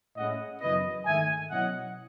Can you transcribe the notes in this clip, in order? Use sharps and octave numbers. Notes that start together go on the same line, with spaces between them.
A2 G#3 C#4 E4 D#5 F#5
F#2 C#3 E3 B3 E4 B4 D#5
G#2 D#3 A3 E5 G#5
B2 F#3 C#4 E4 D#5 F#5